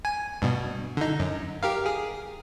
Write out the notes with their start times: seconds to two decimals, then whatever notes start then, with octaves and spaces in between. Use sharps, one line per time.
0.05 G#5
0.42 G2 B2
0.97 D3 D#4
1.19 F#2
1.63 G4 A#4 F5
1.86 G#4